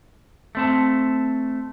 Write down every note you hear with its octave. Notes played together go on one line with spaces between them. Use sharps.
A3 C4 A5